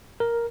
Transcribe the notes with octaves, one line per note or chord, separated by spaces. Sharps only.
A#4